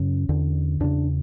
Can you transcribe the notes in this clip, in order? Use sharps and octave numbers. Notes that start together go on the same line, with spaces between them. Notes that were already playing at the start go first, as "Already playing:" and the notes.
Already playing: F#2 C#3 C#4
E2 D3
E2 C#3 D4